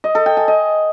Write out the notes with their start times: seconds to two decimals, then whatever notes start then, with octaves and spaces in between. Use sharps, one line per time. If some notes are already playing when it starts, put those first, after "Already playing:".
0.04 D#5
0.15 A4
0.26 G5
0.37 G#5
0.48 D#5